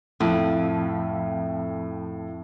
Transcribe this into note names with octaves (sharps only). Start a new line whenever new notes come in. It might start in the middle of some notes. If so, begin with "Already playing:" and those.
F2 A2